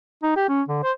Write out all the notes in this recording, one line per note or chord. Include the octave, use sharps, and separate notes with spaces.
D#4
G4
C#4
D3
C5